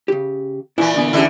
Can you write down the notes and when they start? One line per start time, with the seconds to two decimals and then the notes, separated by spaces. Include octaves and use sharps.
0.08 C#3 G4
0.78 A#2 E3 E4 D5 E5
0.94 D2 D3 B3
1.13 E2 A2 D3 C#4 E4 G4